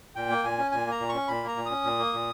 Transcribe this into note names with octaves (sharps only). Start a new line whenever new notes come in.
A#2 G5
A#3
A#2 G#5
C#4
A#2 G#5
A#3 A#5
A#2
C#6
C#4
A#2 B5
A#3 A#5
A#2
C#4 D#6
A#2
A#3
A#2